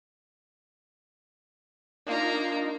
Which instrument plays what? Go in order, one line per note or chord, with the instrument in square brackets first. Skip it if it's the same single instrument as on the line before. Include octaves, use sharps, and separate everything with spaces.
[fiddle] A#3 A#5 [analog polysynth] D4 D#4 F4